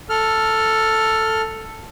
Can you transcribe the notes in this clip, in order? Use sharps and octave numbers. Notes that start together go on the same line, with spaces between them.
A4 F6